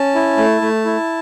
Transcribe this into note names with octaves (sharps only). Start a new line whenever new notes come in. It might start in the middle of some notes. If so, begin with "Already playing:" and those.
Already playing: C#4 A5
E4
A3
A3
E4